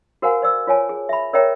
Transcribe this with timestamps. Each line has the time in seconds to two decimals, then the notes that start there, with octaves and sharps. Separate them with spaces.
0.22 F#4 A#4 C5 F5 F#5 G#5
0.42 C5 D5 E6
0.67 F4 C#5 G#5 A5
0.89 G#4
1.09 E5 B5
1.33 A#4 C#5 D5 E5 G5 A#5